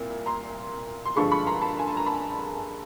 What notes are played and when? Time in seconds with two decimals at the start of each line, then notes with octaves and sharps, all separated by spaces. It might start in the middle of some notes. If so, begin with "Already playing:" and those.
Already playing: C2 A#2
0.26 A#5 C6
1.05 C6
1.16 G2 D3 F3 G#3 B5 C#6
1.32 B5 C#6
1.46 A#5 C6
1.62 A5 B5
1.79 G#5
1.88 A5
1.97 A#5
2.06 A5 B5